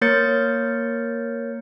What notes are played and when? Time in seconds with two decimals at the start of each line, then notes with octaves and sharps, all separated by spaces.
0.01 A#3 A#4 C#5 G6 A6 C#7